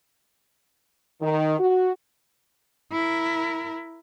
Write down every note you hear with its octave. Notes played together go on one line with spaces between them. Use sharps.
D#3
F#4
E4 A#4